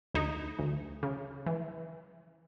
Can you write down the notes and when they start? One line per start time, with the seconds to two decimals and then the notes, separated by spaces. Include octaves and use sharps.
0.14 D2 D#4
0.59 D2
1.03 C#3
1.46 E3